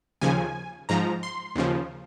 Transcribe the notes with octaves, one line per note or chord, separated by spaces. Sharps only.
D#2 C#3 F3 G#5
G#2 F3 A#5
C6
D#2 C#3 F3